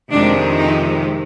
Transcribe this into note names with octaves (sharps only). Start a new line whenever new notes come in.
F2 C3 D#3 G#3 D4
D#4